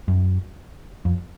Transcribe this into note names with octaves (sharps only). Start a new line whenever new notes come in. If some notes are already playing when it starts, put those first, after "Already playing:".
F#2
F2